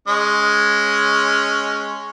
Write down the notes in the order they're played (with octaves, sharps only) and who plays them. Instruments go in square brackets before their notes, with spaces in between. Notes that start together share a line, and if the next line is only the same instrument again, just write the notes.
[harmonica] G#3 C#4